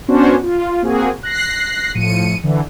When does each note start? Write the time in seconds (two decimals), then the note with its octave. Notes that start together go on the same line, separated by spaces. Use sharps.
0.08 B3 C#4 D4 F#4 C5 C#5
0.43 F4
0.82 A#3 C4 F#4 G#4
1.23 F#6 A#6 C7
1.95 A2 F3 C#7 D#7
2.43 D3 E3